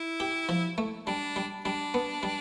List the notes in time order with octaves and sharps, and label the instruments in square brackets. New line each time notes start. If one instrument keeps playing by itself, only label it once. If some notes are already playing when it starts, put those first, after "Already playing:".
Already playing: [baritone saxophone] E4
[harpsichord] G4
F3
A3
[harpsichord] G3 [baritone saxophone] D4
[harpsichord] G3
[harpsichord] G3 [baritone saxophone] D4
[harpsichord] B3
G3